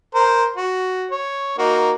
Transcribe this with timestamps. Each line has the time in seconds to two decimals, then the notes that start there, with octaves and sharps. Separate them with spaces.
0.15 A#4 C5
0.56 F#4
1.11 C#5
1.58 A#3 D#4 F#4